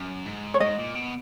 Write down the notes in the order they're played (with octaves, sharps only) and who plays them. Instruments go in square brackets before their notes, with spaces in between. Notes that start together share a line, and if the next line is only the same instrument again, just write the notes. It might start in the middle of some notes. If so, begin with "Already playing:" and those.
Already playing: [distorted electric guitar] F#2
G#2
[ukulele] C#5
[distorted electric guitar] G#2 [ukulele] D#5
[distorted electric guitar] A#2
B2